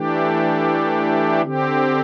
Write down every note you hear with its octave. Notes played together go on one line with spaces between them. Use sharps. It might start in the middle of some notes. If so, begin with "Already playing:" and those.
Already playing: E3 A3 D4 G4
D3 C4 G4